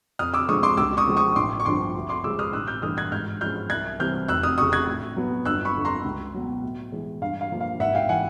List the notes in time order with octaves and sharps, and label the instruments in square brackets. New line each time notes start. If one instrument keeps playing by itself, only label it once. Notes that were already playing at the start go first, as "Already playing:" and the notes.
[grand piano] F2 D#6 F6
D6 E6
D3 F3 G#3 C#6 D#6
C6 D6
C#2 D6 E6
C#6 D#6
C#3 F3 G#3
C#6 D#6
A1 C6 D6
C#6
G2 D3 F3 C6 D6
D2
C6 D6
C#3 F3 G#3 D6 E6
D#6 F6
A1 E6 F#6
F6 G6
G2 E3 A3 D#6 F6
F#6 G#6
G#2 F6 G6
F3 G#3 C#4 F6 G6
C2 F#6 G#6
C3 E3 G3 C4 F6 G6
F1 E6 F#6
D#6 F6
F2 C#3 C#6 D#6
F#6 G#6
A2
F#3 B3
G1 E6 F#6
B5 C#6
F2 D3
A#5 C6
C#2
B2 F#3
A2
E3 G#3
G2 F5
F5
D3 F3 A#3
F5
G#1 E5 F#5
F5 G5
E3 F#5 G#5